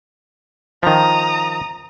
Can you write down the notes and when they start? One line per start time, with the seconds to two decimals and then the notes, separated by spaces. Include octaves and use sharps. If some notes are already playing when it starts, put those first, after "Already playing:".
0.83 D#3 F3 A#5 D#6